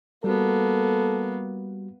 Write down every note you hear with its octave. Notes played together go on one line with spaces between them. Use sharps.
G3 A#3 B3 F#4 A4